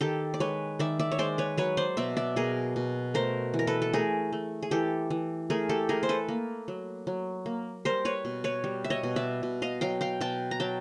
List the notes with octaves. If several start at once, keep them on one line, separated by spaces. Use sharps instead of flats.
D#3 G4 A4
D5
G#3 B4 C#5
D#3 D5 E5
D5 E5
C#5
G#3 C5 D5
B4 C#5
F#3 B4 C#5
C5 D5
B2 D5 E5
D5 E5
B2 G#4 A#4
B2
A3 A#4 C5
E3
A#4
A4 B4
A4
A3 G#4 A#4
A3
G#4
E3 G4 A4
E3
A3 G#4 A#4
G4 A4
A3 G#4 A#4
C5
A4 B4
A#3
F#3
F#3
A#3
G3 A#4 C5
B4 C#5
B2
B4 C#5
G3
E5
C#5 D#5
B2
D5 E5
B2
D#5 F5
F#3 F5 G5
F5 G5
B2 G5 A5
A#5
F#3 G5 A5